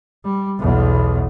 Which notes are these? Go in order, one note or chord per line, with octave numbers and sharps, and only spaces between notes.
G3
B1 E2